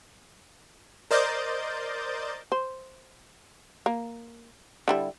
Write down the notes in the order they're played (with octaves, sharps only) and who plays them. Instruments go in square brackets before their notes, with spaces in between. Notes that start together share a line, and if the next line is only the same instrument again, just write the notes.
[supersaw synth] A#4 C5 D5 D#5 G6 A6
[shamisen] C5
A#3
D3 G3 E4